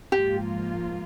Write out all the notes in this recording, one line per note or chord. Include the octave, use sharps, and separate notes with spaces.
G#2 F3 A#3 F4 G4